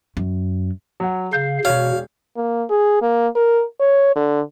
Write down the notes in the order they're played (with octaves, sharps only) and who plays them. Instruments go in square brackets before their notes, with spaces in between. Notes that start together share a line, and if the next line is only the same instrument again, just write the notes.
[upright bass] F#2
[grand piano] F#3 F#5
[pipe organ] C#3 F5 [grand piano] G6
[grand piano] E1 C#5 [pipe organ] B2 [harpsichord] F5
[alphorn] A#3
G#4
A#3
A#4
C#5
D3